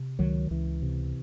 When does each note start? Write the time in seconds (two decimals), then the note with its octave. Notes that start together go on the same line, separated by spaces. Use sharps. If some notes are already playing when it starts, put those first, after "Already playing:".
Already playing: C3
0.19 C#2 D#3 F#3
0.51 C#2 E3
0.82 C3